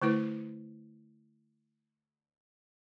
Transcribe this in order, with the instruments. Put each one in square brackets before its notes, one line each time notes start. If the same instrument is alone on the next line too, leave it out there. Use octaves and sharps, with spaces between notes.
[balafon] D3 A3 E4 B4